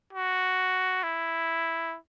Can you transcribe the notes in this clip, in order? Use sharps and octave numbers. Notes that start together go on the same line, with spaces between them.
F#4
E4